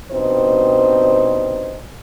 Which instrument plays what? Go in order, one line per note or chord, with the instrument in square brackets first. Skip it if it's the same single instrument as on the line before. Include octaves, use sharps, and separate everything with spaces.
[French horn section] G2 B2 C4 D#4 C5